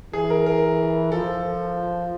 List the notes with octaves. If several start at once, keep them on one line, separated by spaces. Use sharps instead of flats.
E3 G#4
A#4
A#4
F3 A4